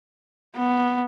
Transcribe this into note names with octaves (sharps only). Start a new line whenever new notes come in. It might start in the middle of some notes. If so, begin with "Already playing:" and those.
B3